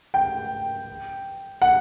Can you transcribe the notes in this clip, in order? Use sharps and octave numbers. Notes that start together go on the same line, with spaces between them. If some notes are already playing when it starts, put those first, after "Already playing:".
G5
F#5